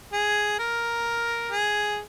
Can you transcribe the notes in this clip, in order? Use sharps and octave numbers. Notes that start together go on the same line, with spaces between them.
G#4
A#4
G#4